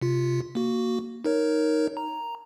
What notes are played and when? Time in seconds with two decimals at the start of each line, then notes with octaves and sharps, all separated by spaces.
0.02 C3 F4
0.55 A#3 F#4
1.25 D#4 A#4 C#5
1.97 A#5